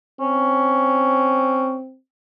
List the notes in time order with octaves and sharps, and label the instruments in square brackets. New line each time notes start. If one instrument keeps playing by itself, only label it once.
[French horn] C4 [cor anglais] C#4